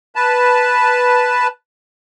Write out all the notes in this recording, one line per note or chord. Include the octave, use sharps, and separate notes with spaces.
B4 A5